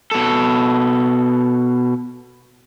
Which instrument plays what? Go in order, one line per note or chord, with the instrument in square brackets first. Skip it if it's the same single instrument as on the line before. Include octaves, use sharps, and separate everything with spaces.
[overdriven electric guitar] B2 A4